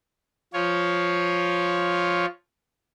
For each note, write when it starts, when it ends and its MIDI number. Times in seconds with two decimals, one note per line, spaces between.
0.54 2.26 53
0.54 2.26 65
0.54 2.26 73